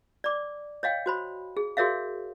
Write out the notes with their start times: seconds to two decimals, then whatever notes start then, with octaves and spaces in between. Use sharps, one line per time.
0.24 D5 D6
0.83 C#5 D#5 F5 G5
1.06 F#4 C5 B5
1.57 G#4
1.77 F#4 G#4 A#4 C#5 E5 F5